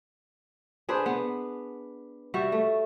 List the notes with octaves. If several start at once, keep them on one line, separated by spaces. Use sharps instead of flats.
D4 G#4 B4 C5
B3
G3 F#4 E5
A3